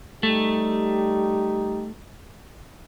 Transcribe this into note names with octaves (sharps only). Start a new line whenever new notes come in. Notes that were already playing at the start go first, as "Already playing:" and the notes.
G3 A3 D#4 G4